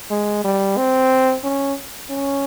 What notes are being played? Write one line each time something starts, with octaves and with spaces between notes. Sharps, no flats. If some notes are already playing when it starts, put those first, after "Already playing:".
G#3
G3
C4
C#4
C#4